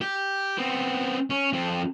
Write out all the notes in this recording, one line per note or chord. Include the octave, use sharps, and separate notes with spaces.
G4
B3 C4
C#4
F2 C4